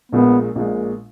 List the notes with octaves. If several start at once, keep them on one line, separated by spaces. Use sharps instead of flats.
A#1 A#2 G#3 B3
A#1 A#2 G#3